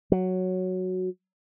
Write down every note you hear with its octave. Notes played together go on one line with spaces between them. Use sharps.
F#3